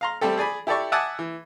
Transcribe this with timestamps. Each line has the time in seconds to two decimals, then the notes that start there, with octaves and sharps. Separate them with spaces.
0.01 F5 A#5 C6
0.21 G3 A3 C4 G4 A4
0.38 G#4 D5 G#5 B5
0.67 E4 G4 A4 D5 C#6
0.92 E5 F#5 G#5 A5 D6 D#6
1.19 E3